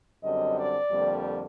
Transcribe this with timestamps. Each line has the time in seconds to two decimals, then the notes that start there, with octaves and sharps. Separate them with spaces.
0.22 F#2 D3 G3 C4 D#5
0.57 D5
0.90 F2 D3 G3 A#3